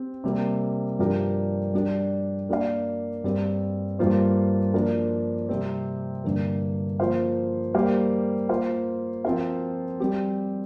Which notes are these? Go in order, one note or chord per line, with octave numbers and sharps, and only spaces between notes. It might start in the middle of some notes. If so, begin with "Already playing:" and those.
Already playing: C4 G4
C3 G3 A#3
G2 F3 D4 G4 A#4
G3 D4 G4
A#3 D4 A#4 D5 F5
G2 G3 C4
G2 G3 A#3 F4 C5
F3 A#3 D4 A#4
C3 G3 C4
G2 D3 A#3
F3 A#3 F4 C5 F5
G3 A#3 G4 C5 F5
A#3 F4 C5 F5
F3 C4 F4 A#4 F5
G3 C4 G4